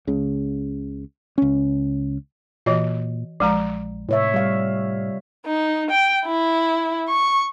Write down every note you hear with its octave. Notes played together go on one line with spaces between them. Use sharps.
C#2 C#3
C#2 C#4
A#2 E3 F#4 D#5
A#1 F3 G#3 A#5
A2 C3 C#5 E5
G3 F5
D#4
G5
E4
C#6